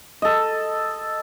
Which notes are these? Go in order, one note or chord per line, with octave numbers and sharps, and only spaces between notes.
A4 D#5